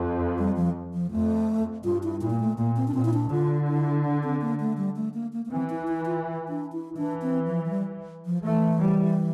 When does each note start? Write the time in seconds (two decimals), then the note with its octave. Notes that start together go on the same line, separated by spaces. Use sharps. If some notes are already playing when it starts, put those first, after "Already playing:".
Already playing: F2
0.38 G3
0.56 F3
0.94 F3
1.11 F2 A3
1.84 G2 F4
2.03 E4
2.21 A#2 E4
2.30 A#3
2.40 A3
2.58 A#2 A#3
2.76 C4
2.88 D4
2.94 A#2 C4
3.05 E4
3.13 D4
3.31 D3 F4
3.68 E4
4.04 D4
4.23 C4
4.41 A#3
4.60 A3
4.77 G3
4.96 A3
5.14 A#3
5.33 A#3
5.45 A#3
5.51 E3 C4
5.70 E4
5.88 E4
6.06 F4
6.49 D4
6.72 E4
6.97 E3 D4
7.22 C4
7.46 F3
7.65 F3
7.70 G3
8.25 F3
8.44 E3 A3
8.81 G3